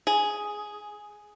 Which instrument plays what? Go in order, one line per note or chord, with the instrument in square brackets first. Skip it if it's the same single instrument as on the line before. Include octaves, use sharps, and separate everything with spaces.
[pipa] G#4